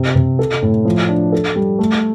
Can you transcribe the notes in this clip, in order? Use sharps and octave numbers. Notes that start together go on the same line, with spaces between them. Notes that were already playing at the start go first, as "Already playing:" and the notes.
Already playing: C3
C3
A4
A2
F3
D4
A4
G3
A3